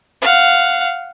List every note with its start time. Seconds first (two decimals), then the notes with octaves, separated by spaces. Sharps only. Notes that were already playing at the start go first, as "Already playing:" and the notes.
0.22 F5 F#5